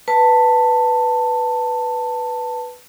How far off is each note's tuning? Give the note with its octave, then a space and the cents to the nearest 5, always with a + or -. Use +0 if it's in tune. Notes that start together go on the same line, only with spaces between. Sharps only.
B4 +0 A5 +15